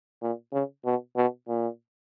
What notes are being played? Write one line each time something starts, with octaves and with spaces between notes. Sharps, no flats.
A#2
C#3
B2
B2
A#2